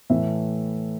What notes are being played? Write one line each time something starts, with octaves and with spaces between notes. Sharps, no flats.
A2 E3 A3 E5